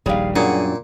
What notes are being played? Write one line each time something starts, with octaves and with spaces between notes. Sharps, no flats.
D#1 A#1 G3 D#4 G#4 F5
F#2 A#2 G3 D4 G#4 F#5